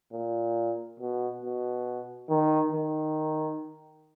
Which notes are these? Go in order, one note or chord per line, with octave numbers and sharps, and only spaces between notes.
A#2
B2
B2
D#3
D#3